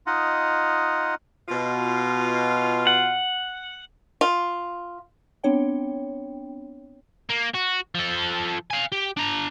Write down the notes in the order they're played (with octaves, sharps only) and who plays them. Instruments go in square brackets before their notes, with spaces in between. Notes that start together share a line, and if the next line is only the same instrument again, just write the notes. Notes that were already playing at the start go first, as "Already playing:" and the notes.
[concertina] D#4 F4 D#5 F#5
[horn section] B2 F4
[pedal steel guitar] F#5
[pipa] F4
[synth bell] B3 C4 D4 C#5 G5
[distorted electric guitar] A#3
F#4
F3 A4
F5 G#5
G4
D4 A#5